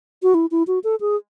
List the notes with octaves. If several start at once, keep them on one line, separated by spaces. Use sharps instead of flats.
F#4
E4
E4
F#4
A4
G#4